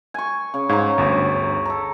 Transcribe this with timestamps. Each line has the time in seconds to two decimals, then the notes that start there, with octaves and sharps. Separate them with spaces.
0.14 G#5 C#6
0.54 C#3
0.69 G#2 C#5 F5 A#5
0.98 G1 D2
1.65 A4 A#5